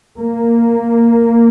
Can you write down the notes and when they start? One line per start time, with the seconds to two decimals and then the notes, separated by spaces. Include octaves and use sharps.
0.17 A#3